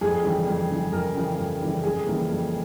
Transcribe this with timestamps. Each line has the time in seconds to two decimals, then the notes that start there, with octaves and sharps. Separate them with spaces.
0.01 F2 G#4
0.23 C#3 E3 G3
0.46 F2
0.70 C#3 E3 G3
0.92 F2 A#4
1.14 C#3 E3 G3
1.38 F2
1.61 C#3 E3 G3
1.83 F2 G#4
2.06 C#3 E3 G3 A#3
2.29 F2